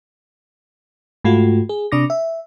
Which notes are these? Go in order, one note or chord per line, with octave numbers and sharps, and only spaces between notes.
G#2 A3 F4 F#4
G#4
C3 D4 D6 A#6
E5